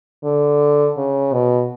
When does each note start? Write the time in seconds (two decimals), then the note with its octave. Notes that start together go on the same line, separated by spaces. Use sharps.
0.24 D3
0.97 C#3
1.33 B2